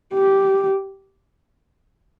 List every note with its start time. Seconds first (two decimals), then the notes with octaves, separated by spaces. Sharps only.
0.14 G4